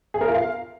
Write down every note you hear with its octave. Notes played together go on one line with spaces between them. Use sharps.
G#4
A#4
F4
F5